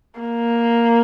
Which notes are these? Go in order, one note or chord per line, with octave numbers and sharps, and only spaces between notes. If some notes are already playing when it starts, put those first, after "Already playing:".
A#3